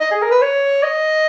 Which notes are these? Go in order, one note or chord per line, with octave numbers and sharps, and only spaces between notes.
D#5
G#4
A#4
B4
C#5
D#5